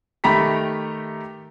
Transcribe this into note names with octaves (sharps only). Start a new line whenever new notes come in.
D#3 A3 G4 A#5 B5 B6